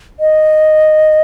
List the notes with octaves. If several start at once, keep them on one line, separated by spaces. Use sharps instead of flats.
D#5